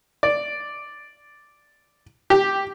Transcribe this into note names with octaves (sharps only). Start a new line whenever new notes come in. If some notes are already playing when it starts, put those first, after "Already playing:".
D5
G4